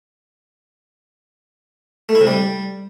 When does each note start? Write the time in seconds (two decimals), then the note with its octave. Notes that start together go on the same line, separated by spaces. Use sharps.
2.09 A3
2.15 E4
2.21 C3
2.27 G3